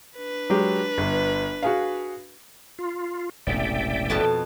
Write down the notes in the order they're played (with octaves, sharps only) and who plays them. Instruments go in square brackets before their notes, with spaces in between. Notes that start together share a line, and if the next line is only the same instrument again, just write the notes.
[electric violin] D4 B4
[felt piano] F#3 G#3 G4
G1
F#4 G#4 F5
[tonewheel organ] F4
[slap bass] E1 A1 C3 [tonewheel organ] D5 E5 G5
[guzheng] F2 B2 A5